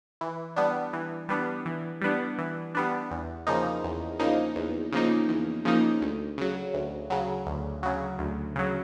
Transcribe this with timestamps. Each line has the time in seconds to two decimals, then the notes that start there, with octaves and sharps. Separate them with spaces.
0.21 E3
0.56 G3 B3 D4
0.93 E3
1.29 G3 B3 D4
1.66 E3
2.01 G3 B3 D4
2.38 E3
2.75 G3 B3 D4
3.11 E2
3.47 C#3 F3 A#3 D#4
3.84 E2
4.19 C#3 F3 A#3 D#4
4.56 E2
4.93 C#3 F3 A#3 D#4
5.29 E2
5.65 C#3 F3 A#3 D#4
6.01 D2
6.38 C#3 F#3
6.74 D2
7.10 C#3 F#3
7.46 D2
7.83 C#3 F#3
8.19 D2
8.56 C#3 F#3